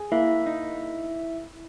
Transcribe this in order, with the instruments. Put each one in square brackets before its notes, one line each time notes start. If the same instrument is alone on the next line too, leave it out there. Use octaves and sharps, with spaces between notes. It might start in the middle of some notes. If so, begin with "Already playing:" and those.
Already playing: [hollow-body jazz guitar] G#4
[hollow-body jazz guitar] A#3 [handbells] E4 E5
[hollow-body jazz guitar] D#4